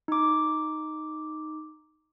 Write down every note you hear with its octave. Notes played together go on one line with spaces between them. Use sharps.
D#4 D6